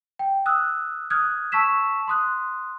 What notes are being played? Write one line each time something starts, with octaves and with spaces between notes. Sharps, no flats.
G5
D#6 E6 F#6
D#6 F6 F#6 G#6
A5 C#6 E6 B6 E7
C6 D#6 F#6